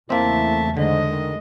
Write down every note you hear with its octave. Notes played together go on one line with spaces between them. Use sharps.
E2 C#3 A3 A#3 C4 E4 E5 A5
G#2 D3 G#3 D#5
D#3